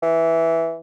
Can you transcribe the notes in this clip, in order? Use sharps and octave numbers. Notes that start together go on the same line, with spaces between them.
E3